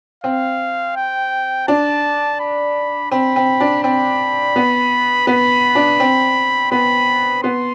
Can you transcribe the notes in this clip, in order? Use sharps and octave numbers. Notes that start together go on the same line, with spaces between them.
C4 F5
G5
D4 A5
B5
C4 B5
C4
D4
C4 B5
B3
B3 B5
D4
C4
B3 B5
B3 C6